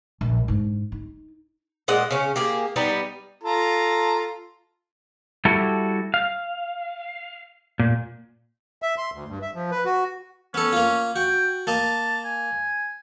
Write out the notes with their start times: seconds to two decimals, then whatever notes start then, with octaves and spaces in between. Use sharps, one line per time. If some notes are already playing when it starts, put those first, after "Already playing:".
0.21 A#1
0.48 G#2 D4
0.92 D#4
1.88 A#2 G#3 D#5 F#5
2.11 C#3 C#4
2.36 A#3 G4 G#4
2.76 G3 B3 D#4
3.43 F4 A4 A#5
5.45 G3 E4 F#4 A4
6.14 F5
7.79 A#2
8.82 E5
8.98 C6
9.14 D2
9.28 G2
9.42 E5
9.54 F3
9.71 B4
9.85 F#4
10.54 B3 C#4 A4
10.73 A#3 F4
11.16 F#4 G5
11.67 A#3 D#5 A5
12.25 G#5